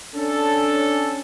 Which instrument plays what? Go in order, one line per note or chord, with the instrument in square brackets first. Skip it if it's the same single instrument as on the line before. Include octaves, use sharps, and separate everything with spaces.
[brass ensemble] C#4 D4 A4